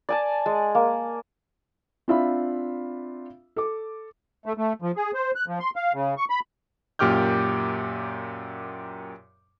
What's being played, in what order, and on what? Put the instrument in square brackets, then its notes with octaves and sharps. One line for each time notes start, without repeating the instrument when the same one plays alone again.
[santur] D5 G#5 A5
G#3
A#3
[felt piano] C4 D4 F4 E5 F5 B5
A4 D6
[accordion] A3
A3
F3
G#4
C5
F#6
F3
C6
F5
C#3
C#6
B5
[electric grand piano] F#2 A#2 G4 D6 F6 G6